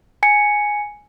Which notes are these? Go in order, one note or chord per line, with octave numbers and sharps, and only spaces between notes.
G#5 C#7